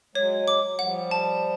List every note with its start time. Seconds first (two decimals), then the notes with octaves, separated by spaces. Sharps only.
0.15 F#3 G#3 C#5
0.48 D6
0.79 F3 G3 F#5
1.11 A5